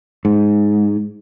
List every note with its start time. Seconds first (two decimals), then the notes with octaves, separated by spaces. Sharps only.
0.25 G#2